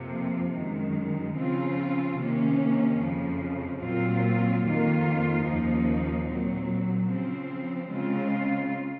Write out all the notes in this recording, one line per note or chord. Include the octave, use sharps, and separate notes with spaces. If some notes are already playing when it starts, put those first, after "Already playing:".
Already playing: F2 C3 F3 A#3
F#2 D#3 G#3
C#3 F3 C4 F4
C3 D#3 A#3 C#4
F2 C#3 F3
A#2 F#3 C4 F4
F2 D#3 A#3 F4
D#2 C#3 F3 A#3 D#4
A#2 F#3 C4
C#3 F3 C4
C#3 G#3 C4 F4